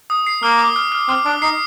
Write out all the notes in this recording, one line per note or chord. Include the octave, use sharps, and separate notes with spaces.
D#6
C7
A#3 F6
D6
F6
F6
C4 F6
D4 D6
D#4 C7